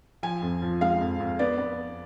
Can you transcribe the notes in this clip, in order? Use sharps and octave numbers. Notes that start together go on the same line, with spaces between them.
F3 G#5
F2
F3
G#3 F5
F2
F2
B3 D5
B3